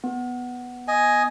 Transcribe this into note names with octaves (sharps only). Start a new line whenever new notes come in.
B3
D#5 G#5